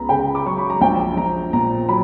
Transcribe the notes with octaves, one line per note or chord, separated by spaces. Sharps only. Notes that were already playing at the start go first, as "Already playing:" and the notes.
Already playing: C#2 B3 A#5 B5
C#3 G5
D6
F#3 C#6
B5
A#5
A#1 G5
A#1 A#5
A#2 A#5
F#3 B5